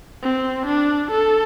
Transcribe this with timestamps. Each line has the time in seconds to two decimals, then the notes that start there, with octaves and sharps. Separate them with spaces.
0.23 C4
0.66 D4
1.10 A4